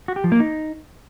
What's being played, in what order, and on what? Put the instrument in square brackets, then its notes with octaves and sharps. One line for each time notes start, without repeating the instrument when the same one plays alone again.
[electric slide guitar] F#4
G4
F3
A#3
D#4